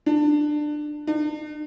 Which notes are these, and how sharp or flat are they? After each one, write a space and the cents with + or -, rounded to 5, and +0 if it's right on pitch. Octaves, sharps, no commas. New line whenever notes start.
D4 +20
D4 +45